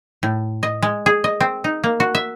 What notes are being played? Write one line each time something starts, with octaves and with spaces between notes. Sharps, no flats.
A2
D#5
G#3
G#4
D#5
C4
D#4
A#3
F#4
E5